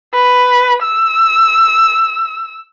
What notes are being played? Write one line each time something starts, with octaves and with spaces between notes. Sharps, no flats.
B4
E6